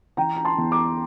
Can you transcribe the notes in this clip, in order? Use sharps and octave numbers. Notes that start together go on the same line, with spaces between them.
E3 G5 A#5
A#5
A5 C6
E2
A#5 D6